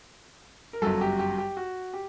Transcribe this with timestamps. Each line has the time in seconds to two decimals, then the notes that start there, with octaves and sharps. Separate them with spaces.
0.73 A#4
0.82 G1 F#2 F#3 A4
1.01 G4
1.19 G4
1.38 G4
1.57 F#4
1.94 G4